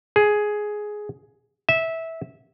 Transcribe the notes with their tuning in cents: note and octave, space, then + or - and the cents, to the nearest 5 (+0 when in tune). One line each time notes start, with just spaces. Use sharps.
G#4 +10
E5 -15